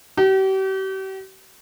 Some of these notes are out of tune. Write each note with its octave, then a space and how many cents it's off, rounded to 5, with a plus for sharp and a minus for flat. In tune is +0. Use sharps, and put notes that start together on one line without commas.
G4 -40